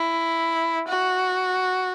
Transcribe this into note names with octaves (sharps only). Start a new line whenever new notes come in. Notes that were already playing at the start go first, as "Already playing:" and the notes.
Already playing: E4
F#4